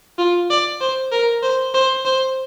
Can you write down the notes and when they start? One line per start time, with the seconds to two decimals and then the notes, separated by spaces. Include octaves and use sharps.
0.18 F4
0.50 D5
0.81 C5
1.12 A#4
1.43 C5
1.74 C5
2.05 C5